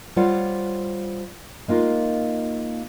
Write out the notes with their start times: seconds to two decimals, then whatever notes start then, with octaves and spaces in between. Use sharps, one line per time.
0.16 G3 F4 C5 C#5 F#5
1.68 G#3 A#3 D#4 F4